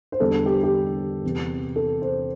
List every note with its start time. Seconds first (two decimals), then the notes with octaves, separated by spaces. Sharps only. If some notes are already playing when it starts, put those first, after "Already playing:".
0.12 C5
0.20 E2 D3 G3 A4
0.46 G4
0.63 G4
1.24 E2 C3 E3
1.76 A4
2.02 C5